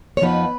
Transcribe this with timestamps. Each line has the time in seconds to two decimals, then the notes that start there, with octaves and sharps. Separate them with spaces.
0.17 C#5
0.22 F2 F3 B3 D#4 B4